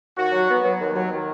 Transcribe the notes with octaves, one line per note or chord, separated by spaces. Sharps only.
D#2 F#4
F#3
B3
F#3
D#2
F#3
D#3